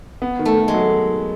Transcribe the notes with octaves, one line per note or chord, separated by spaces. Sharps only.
B3
D#3
A3
D#3
G#3
F#3